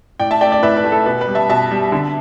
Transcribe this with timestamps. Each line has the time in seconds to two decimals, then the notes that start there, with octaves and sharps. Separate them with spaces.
0.20 A2 D5 G5
0.31 E5 A5
0.41 A3 D5 G5
0.52 D5 G5
0.63 A2 B4 E5
0.77 B4
0.84 A3
0.92 A4
1.06 B2 B4
1.21 B4
1.28 G3
1.35 E5 A5
1.49 B2 E5 A5
1.71 G3
1.92 D3